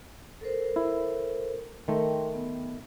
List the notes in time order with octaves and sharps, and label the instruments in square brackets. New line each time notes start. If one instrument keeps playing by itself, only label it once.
[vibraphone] A4 A#4 C5
[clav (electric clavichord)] E4
[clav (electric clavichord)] D#3 A3 [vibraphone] A#4 G5 C6
[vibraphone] B3